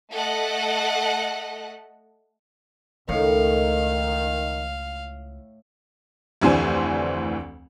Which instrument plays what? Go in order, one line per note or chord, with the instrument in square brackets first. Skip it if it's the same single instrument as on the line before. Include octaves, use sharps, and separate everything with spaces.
[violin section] A3 A4 D#5 F#5
[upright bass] C#2 [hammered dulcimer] A2 [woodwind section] D#3 [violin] F5
[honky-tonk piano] F1 D2 E3 D4 C5 G#5